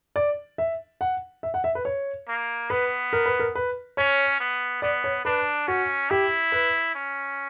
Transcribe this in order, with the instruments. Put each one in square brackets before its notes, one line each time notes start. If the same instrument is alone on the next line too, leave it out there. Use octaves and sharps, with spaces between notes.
[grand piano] D5
E5
F#5
E5
F#5
E5
B4
C#5
[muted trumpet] A#3
[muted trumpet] B3 [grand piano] B4
[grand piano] A#4
B4
A#4
B4
[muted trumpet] C#4 [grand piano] C#5
[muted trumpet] B3
[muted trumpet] B3 [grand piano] D5
[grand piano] C#5
[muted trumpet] D4 [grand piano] B4
[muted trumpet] C#4 [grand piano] F#4
[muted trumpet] E4 [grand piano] G4
[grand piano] B4
[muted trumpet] C#4